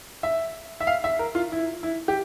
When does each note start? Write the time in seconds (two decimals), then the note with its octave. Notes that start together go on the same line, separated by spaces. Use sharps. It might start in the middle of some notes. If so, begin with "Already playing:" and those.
0.23 E5
0.80 E5
0.87 F5
1.04 E5
1.19 A#4
1.35 F4
1.52 E4
1.83 E4
2.08 G4